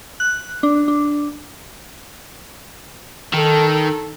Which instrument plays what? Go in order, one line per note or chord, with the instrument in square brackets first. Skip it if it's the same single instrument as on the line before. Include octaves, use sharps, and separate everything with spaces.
[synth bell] F#6
D4
D4
[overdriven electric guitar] D#3 [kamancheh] A4